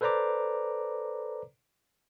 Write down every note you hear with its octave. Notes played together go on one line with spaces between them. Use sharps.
A4 B4 C5 D5 A#5 D6